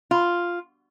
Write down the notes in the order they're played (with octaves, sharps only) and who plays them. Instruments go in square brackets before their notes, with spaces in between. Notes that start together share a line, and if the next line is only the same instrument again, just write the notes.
[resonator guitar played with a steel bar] F4